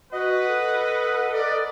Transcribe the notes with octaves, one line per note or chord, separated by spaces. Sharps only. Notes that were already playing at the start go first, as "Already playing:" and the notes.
F#4 B4 D#5 F#5
A4
A#4 B4 D5